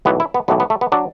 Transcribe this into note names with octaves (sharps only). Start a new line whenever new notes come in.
B1 A2 E3 B3
E4
B3
B1 A2 E3 B3
B3
A3
B3
F#3 D4